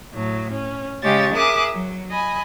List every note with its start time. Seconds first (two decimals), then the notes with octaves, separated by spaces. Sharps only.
0.14 A2 F#3
0.51 C#4
1.03 C#3 G#3 G4 C#5 G5 A6
1.35 G#4 A#4 E5 D6 D#6 F#6
1.73 F#3
2.10 D#5 G#5 B5